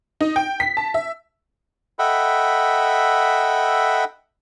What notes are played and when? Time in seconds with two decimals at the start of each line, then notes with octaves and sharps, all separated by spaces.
0.21 D#4
0.36 G5
0.60 B6
0.77 A5
0.94 E5
1.99 A4 D#5 E5 F#5 G5 B5